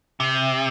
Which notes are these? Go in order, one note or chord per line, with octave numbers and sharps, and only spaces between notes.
C3